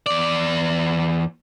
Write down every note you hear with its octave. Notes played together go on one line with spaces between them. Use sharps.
E2 D5